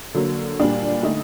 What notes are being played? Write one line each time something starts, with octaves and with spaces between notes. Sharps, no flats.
D3 F#3 A#3
A#2 G3 D4
D3 A3 D#4